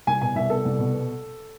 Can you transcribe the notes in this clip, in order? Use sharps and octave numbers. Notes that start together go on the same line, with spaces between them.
C2 G#5
B2 G#5
C2 E5
B3 A4
C2
B2
B3